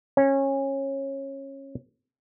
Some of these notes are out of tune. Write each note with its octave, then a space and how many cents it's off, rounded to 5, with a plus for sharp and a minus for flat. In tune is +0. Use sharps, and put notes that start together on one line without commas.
C#4 -20